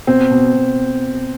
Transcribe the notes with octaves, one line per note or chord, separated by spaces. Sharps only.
B2 C4
B2
B2